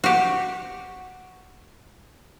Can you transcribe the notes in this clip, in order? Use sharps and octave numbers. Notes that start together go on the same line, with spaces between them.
F#4 G4